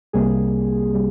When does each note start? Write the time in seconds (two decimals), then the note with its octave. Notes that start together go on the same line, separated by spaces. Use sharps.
0.13 C2 C3 G3 A#3 G#4
0.93 C3 G3